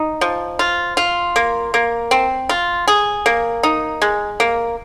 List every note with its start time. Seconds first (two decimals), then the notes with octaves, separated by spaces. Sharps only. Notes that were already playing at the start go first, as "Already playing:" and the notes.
Already playing: D#4
0.21 F3
0.59 F4
0.97 F4
1.36 A#3
1.74 A#3
2.11 C4
2.49 F4
2.88 G#4
3.26 A#3
3.63 D#4
4.02 G#3
4.40 A#3